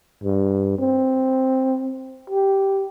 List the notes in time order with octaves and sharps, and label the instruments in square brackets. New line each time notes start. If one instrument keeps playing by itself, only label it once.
[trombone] G2
C4
G4